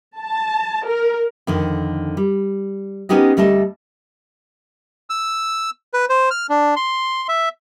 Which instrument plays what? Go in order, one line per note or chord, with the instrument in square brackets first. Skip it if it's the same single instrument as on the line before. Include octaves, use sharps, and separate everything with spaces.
[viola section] A5
A#4
[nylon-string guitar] F2 D3 D#3
G3
B3 C#4 D#4 G4 G#4 D#5
D2 G3 A3 D#5 A5
[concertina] E6
B4
C5
F6
D4
C6
E5